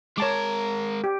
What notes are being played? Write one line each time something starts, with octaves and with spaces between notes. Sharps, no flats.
G#3 A#4 C#5 A5 D6
G4